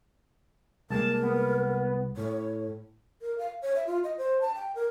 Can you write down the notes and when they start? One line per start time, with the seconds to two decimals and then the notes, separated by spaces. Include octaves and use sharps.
0.90 C2 G#3 A#3 A#4 A5
1.22 B3
2.17 A2 C#5
3.22 A#4
3.38 F5
3.62 C#5
3.76 E5
3.87 F4
4.04 D#5
4.18 C5
4.41 A5
4.55 G5
4.75 A#4